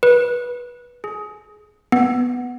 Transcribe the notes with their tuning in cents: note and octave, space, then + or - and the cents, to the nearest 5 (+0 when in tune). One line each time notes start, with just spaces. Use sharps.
B4 -20
G#4 +20
B3 +0